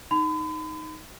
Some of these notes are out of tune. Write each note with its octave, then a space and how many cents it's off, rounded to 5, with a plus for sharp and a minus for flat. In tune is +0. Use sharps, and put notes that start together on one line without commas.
D#4 +0 B5 +40